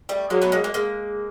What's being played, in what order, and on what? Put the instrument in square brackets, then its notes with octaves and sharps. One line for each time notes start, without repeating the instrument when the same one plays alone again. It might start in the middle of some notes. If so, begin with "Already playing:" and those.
[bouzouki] G3 A3
[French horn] F#3 [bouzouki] G#3 A#3
[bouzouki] A3 B3
G#3 A#3
G#3 A#3
G#3 A#3